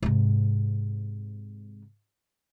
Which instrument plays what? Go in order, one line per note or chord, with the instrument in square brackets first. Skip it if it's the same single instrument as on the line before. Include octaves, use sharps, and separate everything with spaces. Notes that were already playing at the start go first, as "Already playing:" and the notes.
[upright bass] G#2 C3